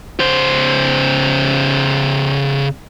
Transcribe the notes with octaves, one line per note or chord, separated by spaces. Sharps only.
C#3 C5